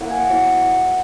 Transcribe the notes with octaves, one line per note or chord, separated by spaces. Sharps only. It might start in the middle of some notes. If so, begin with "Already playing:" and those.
A#3 E4 F#5
G#5
F#5
F#3 B3 E4